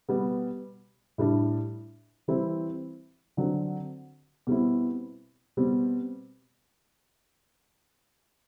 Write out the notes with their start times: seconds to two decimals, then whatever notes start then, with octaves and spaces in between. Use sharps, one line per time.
0.09 B2 G3 B3
1.18 A2 G3 D4
2.28 E3 G3 C4 E4
3.37 D3 F#3 C4
4.47 B2 G3 C4 E4
5.57 B2 G3 C4